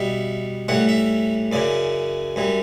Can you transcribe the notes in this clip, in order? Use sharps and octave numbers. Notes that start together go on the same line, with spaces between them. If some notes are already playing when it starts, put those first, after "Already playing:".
Already playing: B2 G3 E5
A2 E3 G3 F#5
E5
F#2 C#3 E3 D5
F#2 E3 G3